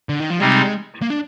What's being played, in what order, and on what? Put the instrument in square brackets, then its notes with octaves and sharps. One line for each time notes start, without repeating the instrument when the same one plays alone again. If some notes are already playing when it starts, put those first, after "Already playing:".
[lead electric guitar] D3
D#3
F3
[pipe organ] C3 G3 C4 D#4 [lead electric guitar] G#3
[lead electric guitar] A#3
D4